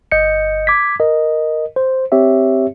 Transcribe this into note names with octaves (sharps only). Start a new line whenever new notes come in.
G1 D#5 G6 C#7
D6 G#6 B6
A#4 D#5
C5
C4 G4 C#5 E5